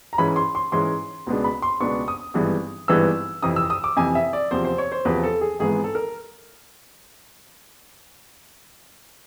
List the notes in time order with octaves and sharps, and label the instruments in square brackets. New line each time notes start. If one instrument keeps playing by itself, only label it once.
[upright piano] A#5
G#2 E3 G#3 C#4 B5
C6
C6
G#2 E3 G#3 C#4 C6
C#2 B2 G#3 B3 D4
B5
C6
C#2 B2 G#3 B3 D4 C#6
D#6
G#1 G2 E3 G#3 B3
G#1 G2 E3 G#3 B3 E6
F2 C3 E3 D#6
E6
D#6
D6
F2 C3 E3 G#5
E5
D5
E2 C3 F3 C5
C5
C#5
C5
E2 C3 F3 B4
A4
G#4
G#1 G#2 E3 G#3 B3 G#4
A4
A#4